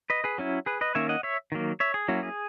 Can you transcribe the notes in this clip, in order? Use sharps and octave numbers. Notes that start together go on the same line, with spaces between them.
B4 D#5
G#4 B4
F#3 C#4 E4
G#4 B4
B4 D#5
D#3 A#3 C#4 C#5 E5
D#5 F#5
C#5 E5
D#3 F#3 A#3
C#5 E5
G#4
F#3 A#3 C#4 E4 F#4
G#4